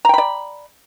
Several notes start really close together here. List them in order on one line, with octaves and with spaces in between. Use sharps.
A#5 G5 B5 D5